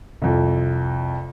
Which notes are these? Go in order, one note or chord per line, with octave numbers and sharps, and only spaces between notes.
C2 F2